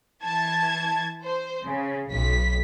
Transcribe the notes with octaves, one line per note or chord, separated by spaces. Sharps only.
E3 A5 G#6
C5
C#3
B1 B6